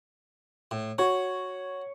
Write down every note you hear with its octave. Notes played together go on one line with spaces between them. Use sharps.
A2
F#4 C#5